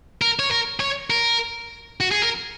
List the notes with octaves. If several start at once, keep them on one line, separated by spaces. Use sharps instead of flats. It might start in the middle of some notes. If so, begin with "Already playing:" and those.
A#4
C#5
A#4
C#5
A#4
F#4
G#4
A#4